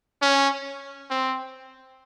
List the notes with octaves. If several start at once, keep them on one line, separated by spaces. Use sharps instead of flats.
C#4
C4